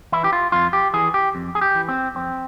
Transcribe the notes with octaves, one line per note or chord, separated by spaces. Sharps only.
E3 E4
G4
F4
F2 F4
G4
E3 G#4
G4
F2
G#4
G4
E3
C4
F2 C4